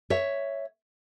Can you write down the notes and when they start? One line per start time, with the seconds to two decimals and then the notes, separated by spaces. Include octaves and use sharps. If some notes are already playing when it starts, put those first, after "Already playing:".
0.10 C#5 E5